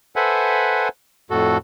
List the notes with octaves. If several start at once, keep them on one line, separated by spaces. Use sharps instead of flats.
A4 B4 C5 E5 F#5 G#5
F2 A2 F#4 A4